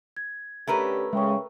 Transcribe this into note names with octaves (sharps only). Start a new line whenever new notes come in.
G#6
D3 A3 C#4 G4 A#4 B4
C#3 G#3 E5 G5 C#6